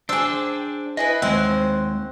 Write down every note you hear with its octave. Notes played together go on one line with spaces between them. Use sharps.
D4 G#4 C5 G5 E6
E4 G#4 B4 D#5
D#2 G#3 C4 F#5